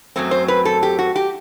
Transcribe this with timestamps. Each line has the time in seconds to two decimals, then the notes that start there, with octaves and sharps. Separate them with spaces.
0.16 F#2 F#3 A3 C4
0.31 C5
0.48 B4
0.65 A4
0.83 G4
0.99 F#4
1.16 G4